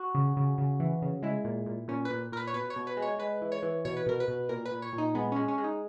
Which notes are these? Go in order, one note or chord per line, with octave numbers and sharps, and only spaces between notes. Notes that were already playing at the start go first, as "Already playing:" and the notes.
Already playing: F#4
C#3
C#3
C#3
E3
C#3
G#3 E4
A#2
A#2
A#2 C#4
B4
A#2
A#2 A#4 B4
C#5
B2 B4
C#5
B2
B4
G#3
C#5
G#3 B4
E3
C#5
E3
B2 C#5
B4
B2 A#4
B4
B2
A#2 A#4
B4
A#2
C#5
A#2
D#4
G#3 B3
G#3 C#4
C#4
G#3
D#4